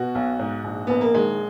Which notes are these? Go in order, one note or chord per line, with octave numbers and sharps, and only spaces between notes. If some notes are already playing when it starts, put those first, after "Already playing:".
Already playing: B2 F#4
B1
G#2
A#1
A#1 B3
A#3
D#3 G#3